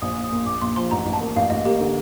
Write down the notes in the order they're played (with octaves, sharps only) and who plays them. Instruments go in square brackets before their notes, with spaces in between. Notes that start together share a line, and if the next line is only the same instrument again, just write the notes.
[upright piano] A#1 [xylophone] D#6
[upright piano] A#1
[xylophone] D#6
[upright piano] A#2
[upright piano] A#1 [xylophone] D6
[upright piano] A#1 [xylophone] C6
[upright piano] F3 [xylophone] C6
[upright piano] A1 [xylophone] A#5
[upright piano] A1
[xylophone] A5
[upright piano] A#3
[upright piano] A1 [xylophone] F5
[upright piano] A1 [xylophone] D#5
[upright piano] A#3 [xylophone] G4
[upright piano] D3